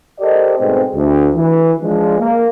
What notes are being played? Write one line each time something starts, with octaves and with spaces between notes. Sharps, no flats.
G4 A4 A#4 C5 D5 D#5
G#2 B2 G#3 A3 C4
D2
E3
F3 G#3 D4
A#3